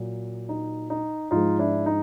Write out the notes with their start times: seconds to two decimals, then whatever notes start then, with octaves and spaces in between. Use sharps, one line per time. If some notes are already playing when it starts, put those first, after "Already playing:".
Already playing: A#2 F#3
0.49 D#4
0.90 D#4
1.31 G#2 F3 G#3 D#4 F4
1.59 D4 E4
1.86 D#4